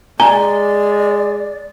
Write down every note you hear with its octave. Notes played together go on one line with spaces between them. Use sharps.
G#3 D5 G#5 A#5